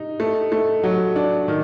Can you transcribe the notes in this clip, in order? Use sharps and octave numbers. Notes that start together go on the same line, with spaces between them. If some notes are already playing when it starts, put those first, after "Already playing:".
Already playing: D#4
A3
A3
F#3
D4
D#3